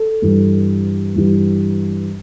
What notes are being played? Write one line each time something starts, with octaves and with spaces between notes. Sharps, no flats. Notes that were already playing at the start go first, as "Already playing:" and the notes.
Already playing: A4
G2 E3 G3
G2 E3 G3